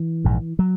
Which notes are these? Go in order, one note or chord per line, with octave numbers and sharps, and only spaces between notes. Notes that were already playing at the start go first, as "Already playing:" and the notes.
Already playing: E3
A#1 G#2
F#3